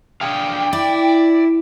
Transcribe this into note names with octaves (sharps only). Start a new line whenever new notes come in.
D4 G#4 F5 G5
E4 D5